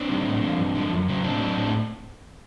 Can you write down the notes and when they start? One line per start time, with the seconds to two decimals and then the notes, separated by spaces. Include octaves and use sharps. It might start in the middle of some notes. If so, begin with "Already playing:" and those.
Already playing: C4 D4
0.09 D#3 G3
0.26 A2
0.42 F3
0.58 G2
0.75 D3 F3
0.92 F#2
1.08 C#3 F#3
1.24 A2 C4 D4
1.40 F#3
1.57 A2